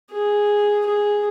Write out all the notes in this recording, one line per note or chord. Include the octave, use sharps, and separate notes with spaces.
G#4
G#4